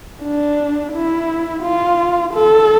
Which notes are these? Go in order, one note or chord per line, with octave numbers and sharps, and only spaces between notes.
D4
E4
F4
A4